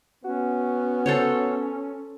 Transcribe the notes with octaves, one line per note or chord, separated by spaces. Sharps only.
B3 C#4 F#4
A4 C5 C#5